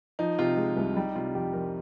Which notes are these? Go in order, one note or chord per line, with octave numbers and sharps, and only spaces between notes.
F3 D#4
C3 F4
G#3
C2
G3 D#4
C3 F4
F2 G4
F2 A#4